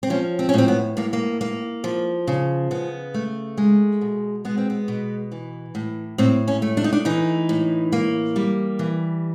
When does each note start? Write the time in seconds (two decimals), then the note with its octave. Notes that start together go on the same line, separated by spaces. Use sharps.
0.03 C4
0.10 F3 C#4
0.39 C4
0.49 C#4
0.53 A2 C4
0.68 B3
0.97 A2 A#3
1.13 A#3
1.41 A#3
1.84 F3
2.27 C#3
2.71 C#3 B3
3.14 A3
3.58 G#3
4.01 B2
4.45 G#3 B3
4.58 C4
4.70 B3
4.88 B2
5.32 E3
5.75 A2
6.18 A2 C4
6.48 C#4
6.62 A3
6.77 D4
6.84 D#4
6.93 D4
7.05 E3 D#4
7.49 A2
7.92 A#3
8.36 G3
8.79 E3